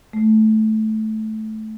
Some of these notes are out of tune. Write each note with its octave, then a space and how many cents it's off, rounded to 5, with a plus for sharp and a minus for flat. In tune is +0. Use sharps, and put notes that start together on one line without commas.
A3 -15